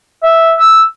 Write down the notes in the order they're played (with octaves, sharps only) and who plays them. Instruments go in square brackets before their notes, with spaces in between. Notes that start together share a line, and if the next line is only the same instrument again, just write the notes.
[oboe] E5
E6